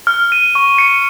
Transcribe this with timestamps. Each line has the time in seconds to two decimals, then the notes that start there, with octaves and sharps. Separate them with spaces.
0.07 F6
0.32 D#7
0.55 C#6
0.78 C#7